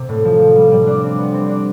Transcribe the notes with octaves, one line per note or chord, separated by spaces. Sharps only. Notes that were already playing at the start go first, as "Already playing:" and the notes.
Already playing: C3
A2
F3
F3
G3
G3
D4
C4
B3
C4
D4